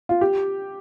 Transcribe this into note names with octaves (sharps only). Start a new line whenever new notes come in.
F4
G4